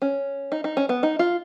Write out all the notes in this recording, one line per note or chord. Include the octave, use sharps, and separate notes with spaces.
C#4
D#4
D#4
C#4
B3
D#4
F4